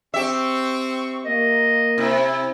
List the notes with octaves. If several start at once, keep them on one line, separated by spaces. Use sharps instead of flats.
C4 G4 E5 C#6
A#3 D#5
C3 E4